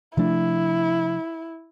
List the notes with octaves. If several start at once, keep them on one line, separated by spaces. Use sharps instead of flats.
C3 F3 A3 D4 E4